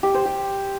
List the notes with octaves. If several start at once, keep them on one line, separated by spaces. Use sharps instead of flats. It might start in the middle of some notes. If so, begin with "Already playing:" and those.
G4
C5
G4